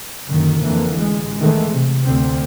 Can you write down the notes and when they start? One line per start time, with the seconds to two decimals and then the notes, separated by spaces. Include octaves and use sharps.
0.30 F#2 A#2 D3 D#3
0.63 F2 D3 E3 A#3
0.97 A1 G#3
1.39 D#3 E3 G#3 A3
1.72 C3
2.06 D2 C4